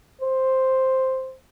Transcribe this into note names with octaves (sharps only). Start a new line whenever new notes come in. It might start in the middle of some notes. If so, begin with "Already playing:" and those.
C5